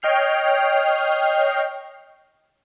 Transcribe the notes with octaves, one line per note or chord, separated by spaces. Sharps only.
C#5 D#5 G5 F6 C7